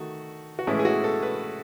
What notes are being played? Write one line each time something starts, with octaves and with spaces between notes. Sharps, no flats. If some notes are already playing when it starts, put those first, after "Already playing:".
Already playing: D#3 A3 F#4
F#4
A2 E3 G#3 C#4 E4
G#4
F#4
A4
B4